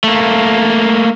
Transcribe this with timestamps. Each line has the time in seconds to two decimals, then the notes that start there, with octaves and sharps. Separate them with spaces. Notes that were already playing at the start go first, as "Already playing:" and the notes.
0.04 A3 A#3